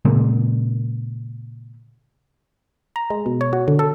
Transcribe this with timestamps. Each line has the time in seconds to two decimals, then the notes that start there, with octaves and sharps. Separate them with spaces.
0.05 A#2 C#3 G#3 A#3
2.96 A#5
3.10 G#3
3.26 B2
3.41 C#5
3.53 F#4
3.68 D3
3.79 A4